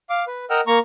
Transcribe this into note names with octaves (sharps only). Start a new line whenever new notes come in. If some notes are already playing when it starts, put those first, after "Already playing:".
F5 D6
B4
A#4 D#5 F#5 G5 E6 F6
A#3 A#5 C#6